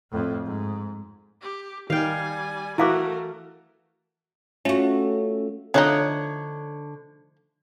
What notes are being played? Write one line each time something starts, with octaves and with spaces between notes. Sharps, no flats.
F2 A2
G#2
G4
D#3 G3 F5 G5 G#5
E3 A3 E4 F#4 A#4 F5 D6
A3 C#4 F4 F#4
D3 F3 A3 D#4 C#5